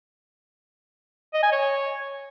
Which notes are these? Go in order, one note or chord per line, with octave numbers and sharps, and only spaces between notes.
D#5
G#5
C#5